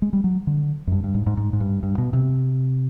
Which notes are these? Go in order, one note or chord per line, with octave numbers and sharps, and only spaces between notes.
G#3
G3
F#3
D3
F#2
G2
G2
G#2
G#2
G#2
G#2
G2
G2
B2
C3